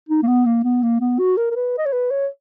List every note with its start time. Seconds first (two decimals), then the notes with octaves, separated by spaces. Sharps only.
0.09 D#4
0.23 A#3
0.28 B3
0.46 A#3
0.64 B3
0.83 A#3
1.01 B3
1.19 F#4
1.37 A#4
1.51 A#4
1.56 B4
1.78 D#5
1.86 C#5
1.93 B4
2.11 C#5